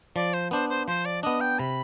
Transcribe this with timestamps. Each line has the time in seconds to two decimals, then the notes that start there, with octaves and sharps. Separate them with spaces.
0.15 F3 D5
0.33 C5
0.51 B3 D4 C5
0.69 C5
0.87 F3 C5
1.05 D5
1.23 B3 D4 D#5
1.40 G5
1.59 C3 B5